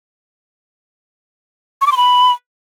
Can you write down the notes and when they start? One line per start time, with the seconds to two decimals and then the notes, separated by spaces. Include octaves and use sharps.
1.81 C#6
1.86 D6
1.92 C6
1.97 B5